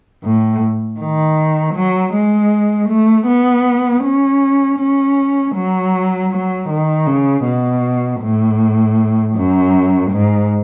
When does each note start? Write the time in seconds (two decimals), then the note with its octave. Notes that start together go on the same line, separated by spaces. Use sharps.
0.23 A2
0.99 D#3
1.75 F#3
2.13 G#3
2.89 A3
3.27 B3
4.03 C#4
4.79 C#4
5.55 F#3
6.31 F#3
6.70 D#3
7.07 C#3
7.45 B2
8.21 A2
9.35 F#2
10.11 G#2